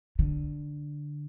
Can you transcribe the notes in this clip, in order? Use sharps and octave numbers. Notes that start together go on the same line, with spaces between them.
D3